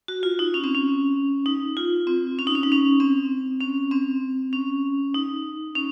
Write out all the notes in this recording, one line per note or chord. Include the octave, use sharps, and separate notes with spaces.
F#4
F4
D#4
C#4
C4
C#4
D#4
F4
C4
C#4
D#4
C#4
D#4
C#4
C4
C#4
C4
C#4
D#4
C#4